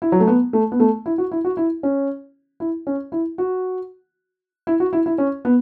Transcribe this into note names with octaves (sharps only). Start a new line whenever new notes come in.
E4
F#3
A3
B3
A3
B3
A3
E4
F#4
E4
F#4
E4
C#4
E4
C#4
E4
F#4
E4
F#4
E4
E4
C#4
B3